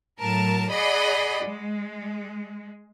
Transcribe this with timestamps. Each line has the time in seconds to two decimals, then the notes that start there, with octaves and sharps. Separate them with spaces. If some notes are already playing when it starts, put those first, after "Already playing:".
0.20 A2 F#3 A#4 A5
0.71 G#4 D5 D#5 F#5 B5
1.44 G#3